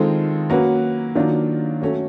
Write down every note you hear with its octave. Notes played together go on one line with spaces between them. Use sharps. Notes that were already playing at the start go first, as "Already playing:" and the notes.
Already playing: D#3 G#3 C4 F4 A4
F#3 A#3 C#4 F#4 B4
D#3 F#3 A#3 D4 F4
F#3 A3 C#4